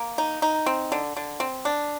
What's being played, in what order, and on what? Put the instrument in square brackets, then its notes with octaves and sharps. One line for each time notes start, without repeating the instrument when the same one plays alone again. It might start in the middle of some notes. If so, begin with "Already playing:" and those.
Already playing: [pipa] A#3
D#4
D#4
C4
D3
D3
C4
D4